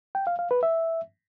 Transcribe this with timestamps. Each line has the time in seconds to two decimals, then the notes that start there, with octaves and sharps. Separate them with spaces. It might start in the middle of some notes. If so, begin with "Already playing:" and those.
0.15 G5
0.27 F5
0.39 F5
0.51 B4
0.63 E5